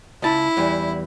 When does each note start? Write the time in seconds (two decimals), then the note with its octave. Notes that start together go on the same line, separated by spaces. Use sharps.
0.22 C#2 E4 A5
0.57 E2 E3 G3